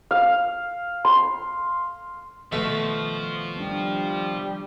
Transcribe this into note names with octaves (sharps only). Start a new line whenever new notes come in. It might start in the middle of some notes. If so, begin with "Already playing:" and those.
F5
C6
B2 D#3 F3 A3 B4
G3 B3 D4